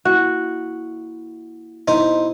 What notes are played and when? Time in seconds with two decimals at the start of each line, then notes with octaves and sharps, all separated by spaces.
0.05 A#3 E4 F#4
1.88 B2 D#4 E4 C5